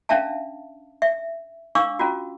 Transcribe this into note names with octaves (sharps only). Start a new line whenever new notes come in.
C#4 D4 E5 F5 A5
E5
D4 F5 C#6 D6 E6
C#4 F4 F#4